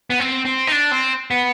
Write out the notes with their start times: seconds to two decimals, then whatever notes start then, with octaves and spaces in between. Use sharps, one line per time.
0.10 B3
0.20 C4
0.45 C4
0.67 D#4
0.72 D4
0.91 C4
1.31 B3